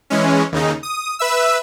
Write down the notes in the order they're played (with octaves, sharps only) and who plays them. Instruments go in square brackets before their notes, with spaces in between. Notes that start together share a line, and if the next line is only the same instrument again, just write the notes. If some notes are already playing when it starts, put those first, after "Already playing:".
[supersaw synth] E3 G#3 C#4
D#2 C#3 D#4
D#6
B4 E5 E6